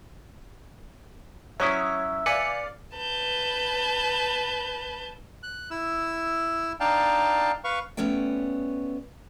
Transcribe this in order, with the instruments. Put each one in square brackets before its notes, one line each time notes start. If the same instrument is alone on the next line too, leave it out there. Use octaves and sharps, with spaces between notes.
[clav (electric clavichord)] F#3 C#4 E4 [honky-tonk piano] C#5 D#6 [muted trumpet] E5
[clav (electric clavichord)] B4 [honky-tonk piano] D5 F5 [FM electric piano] G#5 C#7
[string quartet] B4 A5 G6
[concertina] F#6
E4 E6
D4 D#4 F5 G5 A5
B4 F5 C#6
[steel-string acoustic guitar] A3 B3 C#4 C#5 D5 G5